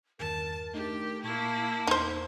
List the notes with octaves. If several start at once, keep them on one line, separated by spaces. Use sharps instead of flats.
E2 G2 D#3 A#4 A5
A3 D4 D#4 G4
A#2 A#3 E4 A5 C#6 G#6
E2 D#4 C5